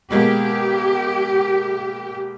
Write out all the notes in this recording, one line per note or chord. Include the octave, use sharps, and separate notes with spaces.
B2 G#3 A#3 G4